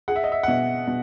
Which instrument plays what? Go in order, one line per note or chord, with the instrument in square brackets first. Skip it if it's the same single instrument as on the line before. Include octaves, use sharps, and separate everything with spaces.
[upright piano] G#4 [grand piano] F#5
[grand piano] E5
D#5
E5
F#5
[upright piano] B2 [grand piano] E5
[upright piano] B2